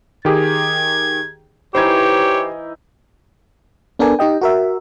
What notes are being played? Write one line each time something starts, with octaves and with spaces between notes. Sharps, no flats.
D#3 G4 G#4 G#6
E3 D#4 E4 G4 C5 C#5 G#6
B3 D4 A4 A#4 D5 G#5
D#4 G4 D#5 G5
F#4 A#4 E5